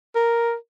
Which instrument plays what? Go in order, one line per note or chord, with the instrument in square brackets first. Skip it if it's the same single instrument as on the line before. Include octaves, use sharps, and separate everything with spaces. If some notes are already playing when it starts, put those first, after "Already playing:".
[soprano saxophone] A#4